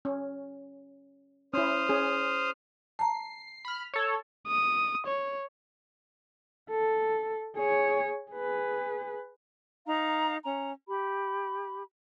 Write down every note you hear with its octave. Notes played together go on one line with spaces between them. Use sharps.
C#4
C#4 E4 C5 D#6 F6
C#4 G#4
A5 A#5 C7
B5 F6
A4 C#5
D#6
C#5
A4
G#4 C#5
G#4 B4
D#4 F5 A#5
C#4 A#5
G4 B5